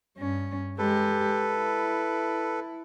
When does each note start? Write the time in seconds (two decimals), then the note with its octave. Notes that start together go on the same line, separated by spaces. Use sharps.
0.18 G2 C#4
0.78 G#3 G4 A4 B4
1.51 E4